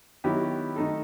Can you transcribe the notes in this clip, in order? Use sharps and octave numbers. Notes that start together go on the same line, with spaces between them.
D#3 F#3 B3 E4 G4
D#3 A3 D#4 A4